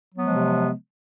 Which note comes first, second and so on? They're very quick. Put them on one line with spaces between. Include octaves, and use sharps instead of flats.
F#3 B3 F3 G#3 C3